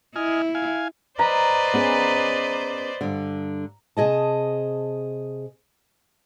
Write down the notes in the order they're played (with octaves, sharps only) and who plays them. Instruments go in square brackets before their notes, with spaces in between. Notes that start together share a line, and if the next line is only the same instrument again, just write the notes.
[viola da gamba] E4 [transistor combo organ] D#5 G#5 F6
[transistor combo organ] F5 G#5
[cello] B4 D#5 [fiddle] C5 D5 [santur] A#5
[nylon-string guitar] B3 C#4 G#4
G2 D3
[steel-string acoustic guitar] C3 G#4 D#5 A5